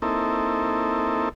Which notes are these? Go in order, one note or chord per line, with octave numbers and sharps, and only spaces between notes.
A#3 C4 D#4 E4 A4